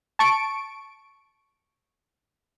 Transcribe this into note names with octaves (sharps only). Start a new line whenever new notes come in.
A5 C#6 D7